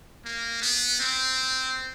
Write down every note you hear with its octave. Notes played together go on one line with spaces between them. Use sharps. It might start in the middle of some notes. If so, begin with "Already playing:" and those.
A#3
B3
C4